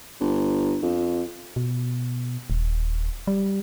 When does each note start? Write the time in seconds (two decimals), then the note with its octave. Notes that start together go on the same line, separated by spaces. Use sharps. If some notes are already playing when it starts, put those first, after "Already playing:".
0.20 G1
0.83 F2
1.56 B2
2.50 D#1
3.27 G3